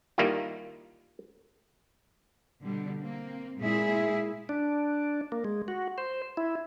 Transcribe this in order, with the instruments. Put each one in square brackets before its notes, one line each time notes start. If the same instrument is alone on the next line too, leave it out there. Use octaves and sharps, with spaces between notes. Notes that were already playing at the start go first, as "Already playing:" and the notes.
[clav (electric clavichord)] D#3 G3 A#3 E4 F4
[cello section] B2 D3 G3
A#3 C4
A#2 G#3 E4 G#4 E5
[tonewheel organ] D4
A#3
G#3
F#4
C5
E4